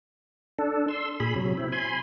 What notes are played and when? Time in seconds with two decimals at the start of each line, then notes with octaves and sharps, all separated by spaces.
0.59 D4 A4
0.88 C6 E6
1.20 A#2 G#4 B5
1.36 C3 F#3
1.57 C4 E4
1.72 G#5 B5 C6